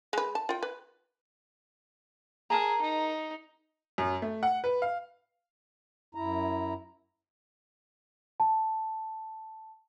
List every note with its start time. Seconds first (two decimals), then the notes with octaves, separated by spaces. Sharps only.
0.13 G#3 B4
0.35 A5
0.49 F4 G5
0.63 B4
2.50 G#4 A#4 A5 A#5
2.81 D#4
3.98 F#2
4.22 A3
4.43 F#5
4.64 B4
4.82 F5
6.15 F#2 E4 A#5
8.40 A5